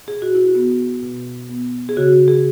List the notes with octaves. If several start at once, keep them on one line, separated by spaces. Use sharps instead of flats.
B2 G#4
F#4
E4
F#4
B3
B2
B3
G#4
C#3 F#4
G#4